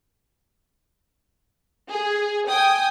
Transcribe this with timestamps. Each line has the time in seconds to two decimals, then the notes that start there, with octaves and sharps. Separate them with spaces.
1.90 G#4
2.49 G5 G#5 D#6